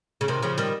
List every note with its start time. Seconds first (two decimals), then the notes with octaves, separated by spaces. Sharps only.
0.21 C#3
0.28 C3 D#3
0.42 C#3 F3
0.58 D#3 G3